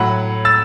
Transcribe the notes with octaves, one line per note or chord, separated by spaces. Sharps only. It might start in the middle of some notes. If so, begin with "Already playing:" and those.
Already playing: A2 F#3 F#5 B5
E6 A6